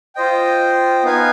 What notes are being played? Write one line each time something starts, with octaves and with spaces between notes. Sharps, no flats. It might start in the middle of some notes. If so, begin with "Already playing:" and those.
F4 C5 D#5 G5
B3 D#4 B4 F5 G#5